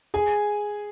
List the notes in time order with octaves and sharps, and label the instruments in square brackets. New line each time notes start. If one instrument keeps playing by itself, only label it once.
[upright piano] G#4 G#5